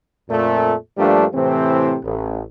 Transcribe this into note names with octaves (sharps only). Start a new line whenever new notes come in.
F2 A#2 A3
G2 F3 G3 A3 A#3 D4
A2 C3 E3 C4
A1